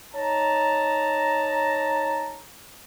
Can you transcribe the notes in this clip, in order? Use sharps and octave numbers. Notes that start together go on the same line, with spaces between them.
D#4 C#5 A5 A#5